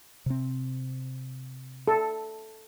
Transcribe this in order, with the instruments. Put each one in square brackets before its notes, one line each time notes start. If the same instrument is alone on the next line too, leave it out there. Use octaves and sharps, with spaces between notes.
[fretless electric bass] C3 C4
[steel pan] A4